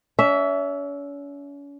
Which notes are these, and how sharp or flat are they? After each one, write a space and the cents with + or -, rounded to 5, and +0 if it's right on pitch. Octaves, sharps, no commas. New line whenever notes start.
C#4 +40 E5 +0